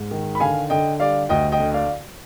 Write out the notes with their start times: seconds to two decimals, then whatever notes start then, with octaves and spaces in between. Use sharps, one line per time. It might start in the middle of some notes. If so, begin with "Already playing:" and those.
Already playing: G#2
0.11 D#3
0.35 B5
0.40 D3 F5 G#5
0.70 D3 D#5 G5
1.00 G3 D5 F5
1.29 D2 D#5 G5
1.52 D#5 G5
1.59 D3
1.74 D5 F5